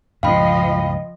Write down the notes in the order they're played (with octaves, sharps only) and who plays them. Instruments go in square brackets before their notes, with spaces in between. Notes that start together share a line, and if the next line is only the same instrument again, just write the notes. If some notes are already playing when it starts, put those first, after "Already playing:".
[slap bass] C#2 G2 A#2 [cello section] F3 D#5 [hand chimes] F5 G5 B5